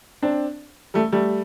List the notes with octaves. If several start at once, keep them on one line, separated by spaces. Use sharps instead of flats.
C4 D4
G3 A3
G3 A3